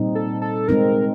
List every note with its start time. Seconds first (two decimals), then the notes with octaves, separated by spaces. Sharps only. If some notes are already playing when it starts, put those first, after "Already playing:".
Already playing: A#2 G3 C4 D#4
0.15 A4
0.42 A4
0.68 G#3 C4 D#4 A#4